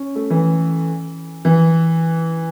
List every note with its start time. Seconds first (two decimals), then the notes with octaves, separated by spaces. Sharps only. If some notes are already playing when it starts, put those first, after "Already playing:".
Already playing: C#4
0.15 A3
0.30 E3
1.45 E3